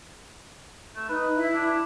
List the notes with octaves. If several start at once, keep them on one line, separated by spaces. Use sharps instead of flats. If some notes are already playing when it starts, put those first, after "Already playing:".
A3
D#4 B4
E4 E5
D4